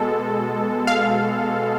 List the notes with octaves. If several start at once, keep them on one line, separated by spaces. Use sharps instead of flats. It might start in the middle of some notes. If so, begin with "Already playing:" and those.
Already playing: B2 G#3 A4
F5